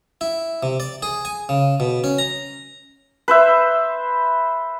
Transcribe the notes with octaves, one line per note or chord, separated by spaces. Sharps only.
E4
C3
D5
G#4
G#5
C#3
B2
C#4
A#5
B4 C5 E5